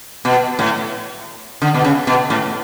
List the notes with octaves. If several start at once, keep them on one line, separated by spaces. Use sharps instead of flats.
B2
A2
D3
B2
C#3
B2
A2